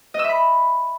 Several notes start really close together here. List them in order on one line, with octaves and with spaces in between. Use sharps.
D#5 E6 E5 B5